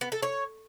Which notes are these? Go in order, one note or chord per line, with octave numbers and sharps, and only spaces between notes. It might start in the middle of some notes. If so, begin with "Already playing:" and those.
B3
A4
C#5